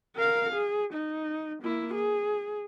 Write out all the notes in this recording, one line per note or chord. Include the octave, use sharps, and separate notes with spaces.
A#4 F5
G#4
D#4
A#3 E4
G#4